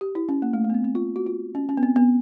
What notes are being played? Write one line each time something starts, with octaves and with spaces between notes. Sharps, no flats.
G4
E4
C#4
A#3
A3
A3
B3
C4
C4
F4
F#4
F4
C#4
C#4
B3
C4
B3